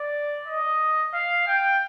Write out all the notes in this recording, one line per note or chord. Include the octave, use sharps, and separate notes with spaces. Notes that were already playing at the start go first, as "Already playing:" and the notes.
Already playing: D5
D#5
F5
G5